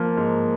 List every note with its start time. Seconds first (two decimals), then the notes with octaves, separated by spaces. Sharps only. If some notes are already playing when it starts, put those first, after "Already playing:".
Already playing: F3 A#3
0.17 G#2